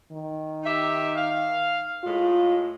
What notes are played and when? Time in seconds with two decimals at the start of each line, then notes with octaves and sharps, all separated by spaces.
0.12 D#3
0.63 D#4 G4 E5
1.16 F5
2.04 A2 G#3 F4